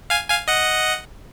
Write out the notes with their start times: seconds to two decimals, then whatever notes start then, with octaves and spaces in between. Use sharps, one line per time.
0.10 F5 G#5
0.29 F5 G#5
0.48 D#5 F#5